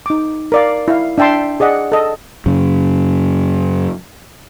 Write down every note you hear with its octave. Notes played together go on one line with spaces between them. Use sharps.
D#4 D6
A#4 D5 F5
E4 F5
D4 E5 G5 A5 C6
G#4 D5 D#5 F#5
A4 D#5
F#2 C#3